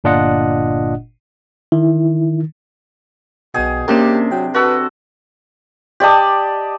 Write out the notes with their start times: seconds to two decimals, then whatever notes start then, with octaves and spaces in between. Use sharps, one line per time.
0.04 G1 A#2 D4 F4 D#5 F#5
1.72 D#3 E4
3.54 B1 B2 G#4 G5
3.88 C3 A#3 C#4 D4 G4 A#4
4.32 F#3 G5
4.54 F#4 A4 B4
6.00 G4 D5 D#5 A5